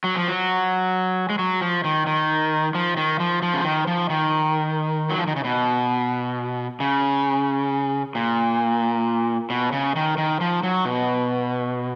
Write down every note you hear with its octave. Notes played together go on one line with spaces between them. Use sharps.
F#3
F3
F#3
G#3
F#3
F3
D#3
D#3
F3
D#3
F3
F3
C#3
D#3
F3
D#3
F#3
F3
D#3
C#3
B2
C#3
A#2
B2
C#3
D#3
D#3
F3
F#3
B2